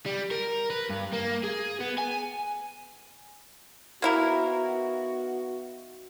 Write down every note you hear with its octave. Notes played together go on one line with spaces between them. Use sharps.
G3
A#4
B4
G2
A#3
G#4
B3
G#5
A#3 B3 D#4 E4 F#4 A#4